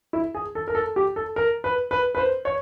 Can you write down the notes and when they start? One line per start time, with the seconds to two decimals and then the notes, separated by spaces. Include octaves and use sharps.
0.13 E4
0.35 G#4
0.55 A4
0.68 A#4
0.75 A4
0.96 G4
1.16 A4
1.36 A#4
1.64 B4
1.91 B4
2.15 B4
2.18 C5
2.45 C#5